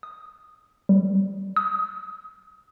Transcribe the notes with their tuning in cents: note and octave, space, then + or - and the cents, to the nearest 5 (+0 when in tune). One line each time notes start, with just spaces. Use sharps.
D#6 -10
G3 -10
D#6 +25